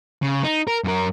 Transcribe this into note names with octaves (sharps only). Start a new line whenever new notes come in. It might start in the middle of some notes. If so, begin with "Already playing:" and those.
C#3
D#4
A#4
F#2 A#4